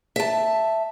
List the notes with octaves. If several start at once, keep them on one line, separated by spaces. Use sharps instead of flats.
E5 A5